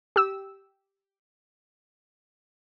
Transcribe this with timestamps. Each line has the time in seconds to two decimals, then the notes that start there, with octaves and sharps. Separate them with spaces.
0.16 G4 E6